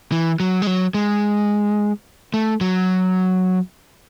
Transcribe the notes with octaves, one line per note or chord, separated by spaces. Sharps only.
E3
F#3
G#3
F#3
G#3
A3
F#3